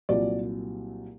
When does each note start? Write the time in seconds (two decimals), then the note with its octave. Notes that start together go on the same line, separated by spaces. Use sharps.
0.09 C2 A#2 F#3 D5